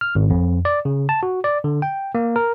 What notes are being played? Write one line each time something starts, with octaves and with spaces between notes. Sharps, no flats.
F6
G#1
F2
D5
C#3
A5
F#4
D5
D3
G5
A#3
A#4